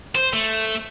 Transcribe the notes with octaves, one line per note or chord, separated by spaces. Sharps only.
C5
A3